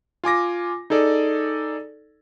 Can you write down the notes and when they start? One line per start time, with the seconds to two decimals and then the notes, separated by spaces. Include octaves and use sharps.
0.24 F4 G#5 D6 A#6
0.90 D#4 G#4 A4 D5